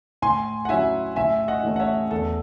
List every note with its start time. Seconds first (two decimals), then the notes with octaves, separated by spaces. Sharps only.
0.22 A2 G#5 C6
0.65 F#5
0.69 F#3 C#4 E4 E5 G#5
1.16 A2 E5 G#5
1.48 D#5 F#5
1.63 E3 A3 C#4
1.76 F#5
1.80 C#5 E5
2.11 E2 A4